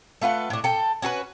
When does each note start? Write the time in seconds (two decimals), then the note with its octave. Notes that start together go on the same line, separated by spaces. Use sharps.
0.21 A3 F4 B4 F#5
0.50 A2 D4
0.64 A4 G5
1.02 C#4 F#4 A4 B4